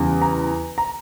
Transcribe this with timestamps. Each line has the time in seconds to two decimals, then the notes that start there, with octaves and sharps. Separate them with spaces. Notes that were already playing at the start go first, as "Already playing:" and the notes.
Already playing: E2 C#3 G3
0.22 A#5
0.78 A#5